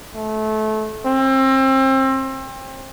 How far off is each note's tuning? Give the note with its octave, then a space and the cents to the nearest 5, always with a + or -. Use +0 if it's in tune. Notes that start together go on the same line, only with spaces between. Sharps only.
A3 -25
C4 +30